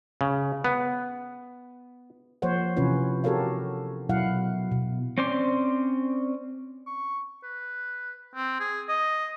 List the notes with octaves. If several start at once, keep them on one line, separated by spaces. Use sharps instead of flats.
C#3
B3
F3 A#3 C5 C#5 F#5
C3 E3 C#4 F4 B4 C#5
F#4 G4 A4 A#4 C#5 F5
B2 F#3 E4 F5 F#5
B2
C4 C#4 C5 D5 C6
C#6
B4
C4
G#4
D#5